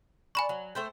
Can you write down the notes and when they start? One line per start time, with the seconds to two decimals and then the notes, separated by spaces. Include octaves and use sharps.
0.35 D4 G#5 B5 C#6
0.49 F#3
0.75 A3 C5 G5